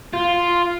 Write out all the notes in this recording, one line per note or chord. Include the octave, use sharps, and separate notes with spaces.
F4